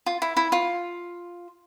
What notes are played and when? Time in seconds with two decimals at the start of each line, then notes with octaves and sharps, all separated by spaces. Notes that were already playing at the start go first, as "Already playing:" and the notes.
0.06 F4
0.22 E4
0.37 E4
0.52 F4